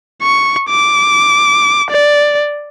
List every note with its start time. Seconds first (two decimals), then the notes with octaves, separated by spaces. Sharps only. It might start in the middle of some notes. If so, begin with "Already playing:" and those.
0.23 C#6
0.69 D6
1.90 D5